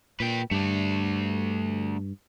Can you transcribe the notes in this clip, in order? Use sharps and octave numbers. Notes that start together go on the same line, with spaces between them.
A#2 B4 G5
G2 A3 D4